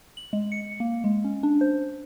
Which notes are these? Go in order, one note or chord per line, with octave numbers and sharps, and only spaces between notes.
F#7
G#3
C#7
A#3
G#3
C#4
D4
C5